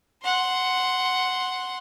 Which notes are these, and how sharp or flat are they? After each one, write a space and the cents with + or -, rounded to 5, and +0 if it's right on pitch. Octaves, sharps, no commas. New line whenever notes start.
F#5 +0 C6 +0